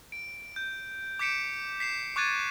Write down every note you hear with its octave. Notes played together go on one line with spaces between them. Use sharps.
D7
G6
D6 G6 B6 C#7 D7 E7
B6 C7 E7
C#6 D6 F#6 G#6 A6 D#7